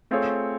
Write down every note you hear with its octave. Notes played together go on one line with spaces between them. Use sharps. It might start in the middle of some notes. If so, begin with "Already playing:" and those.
A3 C4 F4 G#4 C#5